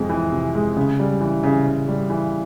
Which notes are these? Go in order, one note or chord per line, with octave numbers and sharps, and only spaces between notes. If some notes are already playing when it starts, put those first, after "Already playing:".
Already playing: F2 C3 G#3
E3
C3
G#3
C#3
G3
E3
C#3
C#3
G3
E3